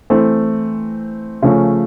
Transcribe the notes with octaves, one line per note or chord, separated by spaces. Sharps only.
E3 A3 C4
C#3 F3 A3 C#4